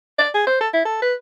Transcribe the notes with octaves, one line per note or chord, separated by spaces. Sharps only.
D5
G#4
C5
A4
E4
A4
B4